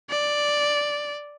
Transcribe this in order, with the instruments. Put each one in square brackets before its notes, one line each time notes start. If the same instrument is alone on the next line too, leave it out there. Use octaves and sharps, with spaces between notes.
[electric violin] D5